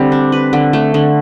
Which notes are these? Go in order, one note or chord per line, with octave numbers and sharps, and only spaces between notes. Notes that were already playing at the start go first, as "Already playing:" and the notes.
Already playing: D3 G3 C4
D4
B4
D3
A3
D3